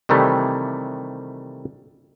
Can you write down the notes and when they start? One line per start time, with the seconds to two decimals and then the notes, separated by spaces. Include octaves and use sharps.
0.09 C3 D#3 E3 G3 A3